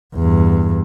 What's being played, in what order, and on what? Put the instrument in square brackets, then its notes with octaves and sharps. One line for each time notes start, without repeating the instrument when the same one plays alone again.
[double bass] E2 G2